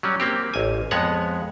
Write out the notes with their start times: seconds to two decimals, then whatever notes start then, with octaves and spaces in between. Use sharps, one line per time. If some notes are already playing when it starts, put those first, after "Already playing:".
0.03 F#3 G3 C#4
0.20 A#3 C4 G4
0.54 A1 G#5
0.91 F2 G#3 B3 C#5 F#5